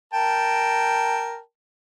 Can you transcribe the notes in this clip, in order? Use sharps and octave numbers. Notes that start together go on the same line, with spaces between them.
A#4 G5 A5